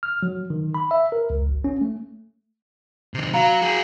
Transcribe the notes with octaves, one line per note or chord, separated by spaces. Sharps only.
F6
F#3
D#3
B5
E5
A#4
C#2
G#1
C#4
A3
C3 D#3
F#3 F5 A#5 B5
F#4 G#4